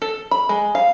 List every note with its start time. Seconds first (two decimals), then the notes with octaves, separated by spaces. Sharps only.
0.02 A4
0.31 B5
0.49 G#3
0.75 F5